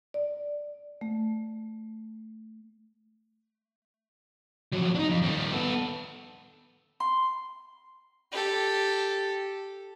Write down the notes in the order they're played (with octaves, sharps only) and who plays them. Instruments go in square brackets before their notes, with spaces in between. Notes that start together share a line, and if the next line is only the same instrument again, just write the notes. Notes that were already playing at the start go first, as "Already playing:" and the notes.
[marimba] D5
A3
[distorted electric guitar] F2 F#3
D4 D#4
F2
D#3 G3
B3 A4
[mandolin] C6
[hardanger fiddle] G4 A4